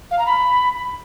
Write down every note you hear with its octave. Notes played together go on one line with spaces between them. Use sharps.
F5
A#5
B5